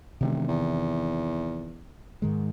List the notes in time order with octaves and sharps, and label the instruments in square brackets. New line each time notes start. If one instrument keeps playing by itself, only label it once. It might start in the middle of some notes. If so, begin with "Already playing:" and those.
[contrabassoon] E1 [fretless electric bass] C3 D#3 E3
[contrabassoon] E2
[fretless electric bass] G#2 D#3 G#3